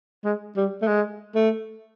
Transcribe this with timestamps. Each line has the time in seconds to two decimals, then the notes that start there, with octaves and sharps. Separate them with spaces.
0.24 G#3
0.56 G3
0.82 A3
0.87 G#3
1.35 A3